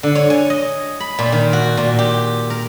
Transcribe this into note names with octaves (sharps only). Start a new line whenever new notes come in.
D3
C#5
G#5
D#5
B5
A#2
D#3
F#4
A#2
G4
A#4